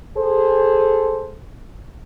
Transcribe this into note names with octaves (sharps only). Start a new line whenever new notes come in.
G#4 A4 C5